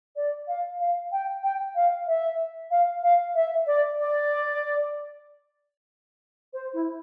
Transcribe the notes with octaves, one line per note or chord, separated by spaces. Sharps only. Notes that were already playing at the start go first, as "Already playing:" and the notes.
D5
F5
F5
G5
G5
F5
E5
F5
F5
E5
D5
D5
C5
E4